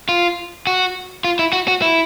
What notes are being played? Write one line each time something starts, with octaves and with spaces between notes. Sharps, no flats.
F4
F#4
F4
E4
F#4
F#4
E4